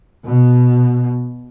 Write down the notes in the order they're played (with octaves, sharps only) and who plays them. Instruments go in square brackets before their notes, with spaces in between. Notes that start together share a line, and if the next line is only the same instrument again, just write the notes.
[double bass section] B2